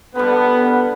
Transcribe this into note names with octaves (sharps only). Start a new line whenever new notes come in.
D3 G3 B3 B4